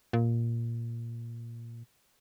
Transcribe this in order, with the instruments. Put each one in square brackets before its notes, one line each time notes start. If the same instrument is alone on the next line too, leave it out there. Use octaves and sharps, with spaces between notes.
[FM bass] A#2